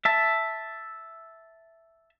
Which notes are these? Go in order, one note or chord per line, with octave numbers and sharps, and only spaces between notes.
E5 A5